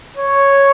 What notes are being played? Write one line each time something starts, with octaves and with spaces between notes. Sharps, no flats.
C#5